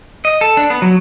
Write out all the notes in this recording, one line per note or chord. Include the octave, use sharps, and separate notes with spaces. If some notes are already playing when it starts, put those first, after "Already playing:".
D#5
A4
D4
B3
F#3